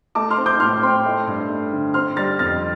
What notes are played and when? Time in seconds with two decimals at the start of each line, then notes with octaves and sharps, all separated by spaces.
0.15 A3 A5 D6
0.30 C6 F6
0.38 C4
0.46 D6 G6
0.60 A2 C6 F6
0.82 C4 G5 C6
1.06 A3
1.27 G2
1.49 A3
1.73 D3
1.94 C4 C6 F6
2.16 G3 F6 A6
2.39 F2 F6 A6